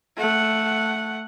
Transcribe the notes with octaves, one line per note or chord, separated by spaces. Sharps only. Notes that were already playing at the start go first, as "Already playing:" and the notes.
A3 F#5